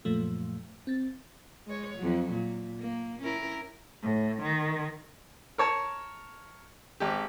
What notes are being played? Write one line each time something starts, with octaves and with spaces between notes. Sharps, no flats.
F#2 A#2 F3 A3
C4 A6
G#3 C#5
F2 F#3
A#2
A#3
C#4 E4 A#4
A2
D#3
A#4 C#5 A5
G#1 G4